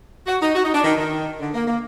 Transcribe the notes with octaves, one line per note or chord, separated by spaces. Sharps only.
F#4
D#4
F#4
D#4
D4
D#3
D#3
D3
A#3
A#3